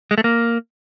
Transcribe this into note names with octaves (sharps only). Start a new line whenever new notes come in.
G#3
A3
A#3